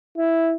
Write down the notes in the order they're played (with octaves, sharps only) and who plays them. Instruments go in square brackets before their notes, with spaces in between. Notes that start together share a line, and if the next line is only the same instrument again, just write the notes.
[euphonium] E4